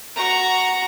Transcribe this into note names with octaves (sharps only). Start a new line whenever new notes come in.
F#4 A#5